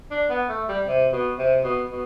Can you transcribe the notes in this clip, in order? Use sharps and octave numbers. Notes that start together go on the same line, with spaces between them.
D4
B3
A3
G3
C3
B2
C3
B2
B2